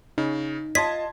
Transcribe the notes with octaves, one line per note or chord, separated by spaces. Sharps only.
C#3 D#4
F4 D#5 A5 C6 G#6 B6